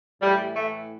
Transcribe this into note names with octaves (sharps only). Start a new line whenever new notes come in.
A2 E3 G3
A3